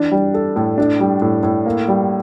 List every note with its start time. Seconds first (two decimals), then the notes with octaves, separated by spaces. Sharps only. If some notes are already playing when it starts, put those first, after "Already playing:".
Already playing: E3 D4
0.11 G3
0.34 A4
0.56 A2
0.78 D4
1.00 G3
1.22 A2
1.43 A2
1.66 A#3
1.88 G3